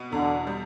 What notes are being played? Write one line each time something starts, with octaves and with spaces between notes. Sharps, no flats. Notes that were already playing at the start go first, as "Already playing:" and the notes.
Already playing: B2 B3
E2 D3
G3